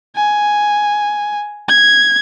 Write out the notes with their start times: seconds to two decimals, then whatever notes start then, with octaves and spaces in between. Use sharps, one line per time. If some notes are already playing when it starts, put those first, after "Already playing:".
0.16 G#5
1.69 G#6